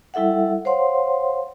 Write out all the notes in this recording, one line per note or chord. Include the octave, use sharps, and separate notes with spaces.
G3 E4 A4 E5 F#5
C5 C#5 F5 F#5 C6